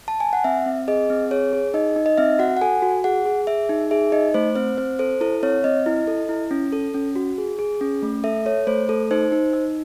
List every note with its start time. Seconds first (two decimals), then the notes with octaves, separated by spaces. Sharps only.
0.08 A5
0.20 G#5
0.33 F#5
0.44 C4 E5
0.66 C4
0.88 G#4 D#5
1.10 C4
1.31 G#4 C#5
1.53 G#4
1.74 D#4 D#5
1.96 D#4
2.06 D#5
2.17 C4 E5
2.39 F#4 F#5
2.57 F#5
2.61 A4 G#5
2.82 F#4
3.04 G#4 F#5
3.26 G#4
3.47 G#4 E5
3.69 D#4
3.91 G#4 E5
4.12 D#4 D#5
4.34 A3 C5
4.56 C4 C5
4.78 C4 C5
4.99 A4 C5
5.21 E4 A4
5.43 C4 C#5
5.64 C4 D#5
5.86 E4
6.07 A4
6.29 E4
6.51 C#4
6.72 A4
6.94 C#4
7.16 F#4
7.38 G#4
7.59 G#4
7.81 C#4
8.02 A3
8.24 A4 E5
8.46 A4 C#5
8.67 A3 C5
8.89 A3 A4
9.11 D#4 C5
9.32 D#4
9.53 D#4